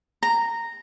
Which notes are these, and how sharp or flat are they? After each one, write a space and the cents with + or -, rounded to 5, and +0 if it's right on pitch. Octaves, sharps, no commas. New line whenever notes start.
A#5 -10